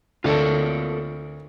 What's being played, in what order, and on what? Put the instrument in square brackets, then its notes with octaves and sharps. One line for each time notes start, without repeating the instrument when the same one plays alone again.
[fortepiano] D2 [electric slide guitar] F4 A4 A#4